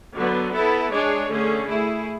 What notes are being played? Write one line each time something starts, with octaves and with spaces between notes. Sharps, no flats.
D3 F#3 B3
B3 E4 A4
G#3 D4 G#4 C#5
D3 A3 C#4 G#4
A3 E4 G#4